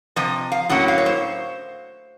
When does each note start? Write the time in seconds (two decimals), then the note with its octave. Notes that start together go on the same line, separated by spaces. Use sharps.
0.16 C3 F3 D#5
0.52 F5
0.69 A2 F#3 A#3 C#4 F#5
0.88 F5
0.98 C#5
1.06 C5